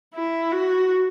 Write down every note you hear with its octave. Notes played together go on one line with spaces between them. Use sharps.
E4
F#4